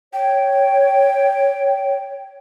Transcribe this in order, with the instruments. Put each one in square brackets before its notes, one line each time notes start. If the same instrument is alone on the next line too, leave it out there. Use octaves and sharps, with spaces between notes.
[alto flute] C#5 [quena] G5